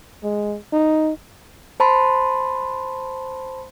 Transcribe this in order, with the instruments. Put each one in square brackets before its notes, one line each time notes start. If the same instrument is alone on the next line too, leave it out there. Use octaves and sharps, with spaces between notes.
[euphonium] G#3
D#4
[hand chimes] C5 A5 B5 C6